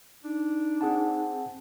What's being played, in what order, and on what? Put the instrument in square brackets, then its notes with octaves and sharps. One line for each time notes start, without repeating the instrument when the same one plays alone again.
[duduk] D4 [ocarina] D#4
[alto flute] C4 [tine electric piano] G#4 F#5 A5